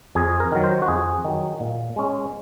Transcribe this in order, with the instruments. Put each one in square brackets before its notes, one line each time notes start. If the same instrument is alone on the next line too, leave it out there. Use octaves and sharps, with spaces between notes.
[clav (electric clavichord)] F2 G#4
A#4
D#3 F#3
C5
F#4
F2 G#4
D#3 F#3
A#2
G#3 C#4